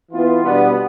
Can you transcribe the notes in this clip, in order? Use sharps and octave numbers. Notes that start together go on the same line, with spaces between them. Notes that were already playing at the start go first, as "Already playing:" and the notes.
E3 B3 F4
B2 G3 B3 D4